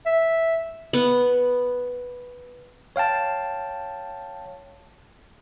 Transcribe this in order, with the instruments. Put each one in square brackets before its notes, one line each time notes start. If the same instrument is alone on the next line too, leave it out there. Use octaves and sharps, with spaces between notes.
[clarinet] E5
[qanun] B3 F#5
[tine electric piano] C#5 F5 G5 A5